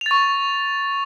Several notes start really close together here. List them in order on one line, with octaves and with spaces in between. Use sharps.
F7 A6 C#6